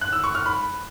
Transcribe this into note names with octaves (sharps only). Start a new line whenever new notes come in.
F#6
E6
C#6
F6
B5